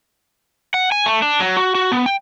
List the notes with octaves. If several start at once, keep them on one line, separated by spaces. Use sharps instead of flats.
F#5
G#5
A3
D4
F#3
F#4
F#4
B3
G5